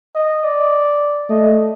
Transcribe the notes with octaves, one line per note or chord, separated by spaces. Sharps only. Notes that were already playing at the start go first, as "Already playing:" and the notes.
D#5
D5
A3 D#5